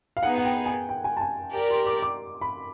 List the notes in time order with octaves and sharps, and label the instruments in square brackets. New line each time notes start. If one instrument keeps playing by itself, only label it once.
[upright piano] F5
[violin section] B3 D#4 G#4 [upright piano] F#5
[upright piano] F#5
G5
G#5
G5
G#5
A5
G#5
[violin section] G4 A#4 D5
[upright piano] C6
D6
D6
B5